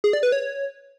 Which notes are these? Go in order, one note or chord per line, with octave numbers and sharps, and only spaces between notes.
G#4
D5
B4
C#5